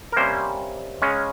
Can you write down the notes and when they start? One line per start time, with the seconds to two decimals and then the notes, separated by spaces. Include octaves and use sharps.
0.12 A#4
0.17 C3 G3 A#3 C#4 C5
1.02 C#3 G#3 C#4